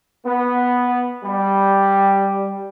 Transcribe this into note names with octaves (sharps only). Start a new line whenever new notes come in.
B3
G3